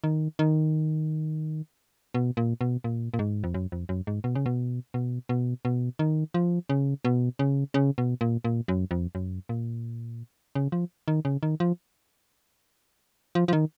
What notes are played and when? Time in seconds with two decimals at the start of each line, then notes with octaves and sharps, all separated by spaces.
0.04 D#3
0.39 D#3
2.14 B2
2.37 A#2
2.61 B2
2.84 A#2
3.14 A#2
3.19 G#2
3.44 F2
3.54 F#2
3.72 F2
3.89 F#2
4.07 G#2
4.24 B2
4.35 C#3
4.46 B2
4.94 B2
5.29 B2
5.65 B2
5.99 D#3
6.34 F3
6.69 C#3
7.05 B2
7.39 C#3
7.74 C#3
7.98 B2
8.21 A#2
8.44 A#2
8.68 F#2
8.91 F2
9.15 F#2
9.49 A#2
10.55 C#3
10.72 F3
11.08 D#3
11.25 C#3
11.43 D#3
11.60 F3
13.35 F3
13.48 F3
13.53 D#3